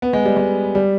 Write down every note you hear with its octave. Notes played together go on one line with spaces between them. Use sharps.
B3
G#3
G3
G#3
G3